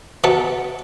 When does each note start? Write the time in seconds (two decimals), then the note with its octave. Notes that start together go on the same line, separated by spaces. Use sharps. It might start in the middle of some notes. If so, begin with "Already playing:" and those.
0.24 B2 B3 A5